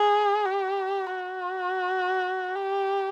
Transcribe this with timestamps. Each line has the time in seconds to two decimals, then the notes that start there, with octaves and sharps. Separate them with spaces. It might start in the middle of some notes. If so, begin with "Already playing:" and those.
Already playing: G#4
0.46 G4
1.16 F#4
2.56 G4